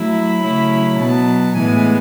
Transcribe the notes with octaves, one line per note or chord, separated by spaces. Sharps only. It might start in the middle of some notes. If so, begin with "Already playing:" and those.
Already playing: F#3 A3 E4
B5
C#3 F#3 A3 C#4 E4
B2 F#3 B3 A5
A2 E3 G#3 B3 G#5